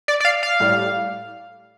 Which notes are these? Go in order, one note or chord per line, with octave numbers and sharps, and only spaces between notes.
D5
D5
F5
F5
A2 G3